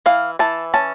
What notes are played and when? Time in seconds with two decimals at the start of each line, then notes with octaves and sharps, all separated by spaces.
0.06 E3 F5
0.39 E3 A5
0.74 C#4 A5